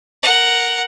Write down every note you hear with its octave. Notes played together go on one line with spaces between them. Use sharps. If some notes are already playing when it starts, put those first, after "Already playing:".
A#4 F#5